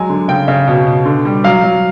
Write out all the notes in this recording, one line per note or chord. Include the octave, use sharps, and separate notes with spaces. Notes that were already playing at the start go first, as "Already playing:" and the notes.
Already playing: F#3 G#3 G#5
D3
C#3 G5
C#3
B2
B2
D3
G3
F#3 F5
F#3